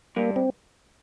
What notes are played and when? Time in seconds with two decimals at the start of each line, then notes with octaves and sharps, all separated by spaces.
0.16 G2 A#3
0.36 C4